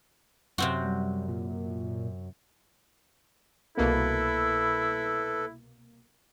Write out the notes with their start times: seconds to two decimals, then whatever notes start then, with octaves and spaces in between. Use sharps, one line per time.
0.58 F#2 C3 C4 F#4
0.84 G3
1.28 A#2
3.77 C2 B2 A#3 E4 A4 B4